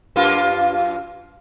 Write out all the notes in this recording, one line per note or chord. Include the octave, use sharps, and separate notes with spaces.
F#2 A#3 F4